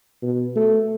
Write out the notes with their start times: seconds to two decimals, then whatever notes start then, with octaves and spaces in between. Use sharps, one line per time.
0.22 B2
0.56 A3